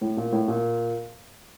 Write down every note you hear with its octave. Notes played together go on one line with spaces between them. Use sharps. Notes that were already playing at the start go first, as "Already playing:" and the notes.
A2
A#2
A2
A#2